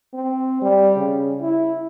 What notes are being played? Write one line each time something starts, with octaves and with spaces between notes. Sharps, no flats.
C4
G3
C#3
E4